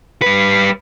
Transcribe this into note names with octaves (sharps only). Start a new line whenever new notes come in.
G3 B4